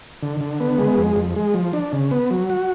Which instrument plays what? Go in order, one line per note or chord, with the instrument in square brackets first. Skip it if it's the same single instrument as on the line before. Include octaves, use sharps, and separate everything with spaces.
[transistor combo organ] D3
D3
B3
G#3
F2
F2
G#3
F3
D4
C#3
B3
F#3
F#4